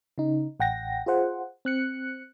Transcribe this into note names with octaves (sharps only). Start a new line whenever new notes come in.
C#3 D#4
A1 F#5 G5 A#6
F4 G#4 C5 F#5
C4 F#6 C#7